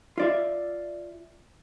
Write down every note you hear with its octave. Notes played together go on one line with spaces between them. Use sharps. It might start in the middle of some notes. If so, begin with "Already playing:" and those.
F4 D5 E5